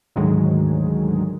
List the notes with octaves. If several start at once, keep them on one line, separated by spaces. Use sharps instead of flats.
D2 G#2 D3 D#3 F#3 G#3